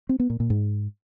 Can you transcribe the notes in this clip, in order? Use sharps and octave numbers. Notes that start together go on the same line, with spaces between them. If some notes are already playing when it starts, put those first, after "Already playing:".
C4
B3
A#2
A#2
G#2